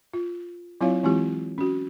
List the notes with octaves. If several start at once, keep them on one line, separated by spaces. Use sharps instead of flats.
F4
F#3 C4 E4 F4 C#5 F5
E3 G#3 C4 E4 F4 G4
C#4 F#4